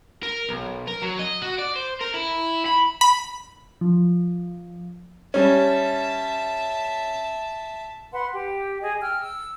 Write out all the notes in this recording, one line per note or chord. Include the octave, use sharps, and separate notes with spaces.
A#4
B1
A#4
F#3
D#5
F#4
D5
C5
A#4
E4
B5
B5
F3
G3 C#4 E5 A5
B4 F#5 C6
G4
G#4 D#5 G#5
G5 E6 F6
E6